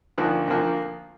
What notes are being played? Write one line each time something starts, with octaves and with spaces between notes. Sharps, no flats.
D2 D3 F3 A#3 D#4
D2 D3 F3 A#3